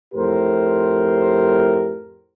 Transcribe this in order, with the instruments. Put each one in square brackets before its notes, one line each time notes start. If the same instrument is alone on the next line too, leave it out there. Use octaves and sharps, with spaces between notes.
[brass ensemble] F2 A2 G4 A#4 C5